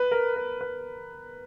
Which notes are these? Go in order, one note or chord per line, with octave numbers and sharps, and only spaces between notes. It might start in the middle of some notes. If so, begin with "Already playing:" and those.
Already playing: B4
A#4
A#4
B4